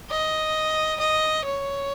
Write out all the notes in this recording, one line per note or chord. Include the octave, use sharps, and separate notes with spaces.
D#5
D#5
C#5